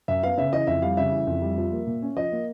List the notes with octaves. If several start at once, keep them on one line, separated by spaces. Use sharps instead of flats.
F#2 E5
B3 F5
C#3 E5
E3 D#5
F2 E5
G3 F5
C#3 E5
E3
F2
G3
F3
A#3
A#2
C#4
F3 D#5
A#3